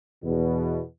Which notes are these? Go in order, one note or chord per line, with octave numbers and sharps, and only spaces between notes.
E2 B2